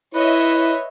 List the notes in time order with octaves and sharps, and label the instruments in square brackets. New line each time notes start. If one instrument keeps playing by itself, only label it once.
[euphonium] E4 [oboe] B4 [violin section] C#5 D#5 E5